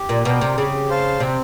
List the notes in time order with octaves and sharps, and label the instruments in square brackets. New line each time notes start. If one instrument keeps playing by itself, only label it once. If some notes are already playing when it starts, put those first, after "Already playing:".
Already playing: [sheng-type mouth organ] G4
[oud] A#2
[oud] B2 [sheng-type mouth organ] A#4 D5 G5
[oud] C3
[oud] C#3 [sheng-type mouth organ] G4
[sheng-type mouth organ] C5 F5 A5
[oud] C3 [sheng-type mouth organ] C4